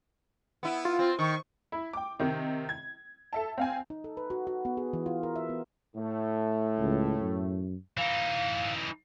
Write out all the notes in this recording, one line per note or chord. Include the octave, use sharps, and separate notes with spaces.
B3 E4
F4
C4
D#3 C#6
E4
G5 D6
C3 D#3
G#6
A4 E5 A5
C4 F5 G#5
D#4
A4
B4
F#4
F#4
B3
G#4
E3
F4
A#4
E5
B3
A2 A3
C#2
F#2
E3 D#4 F5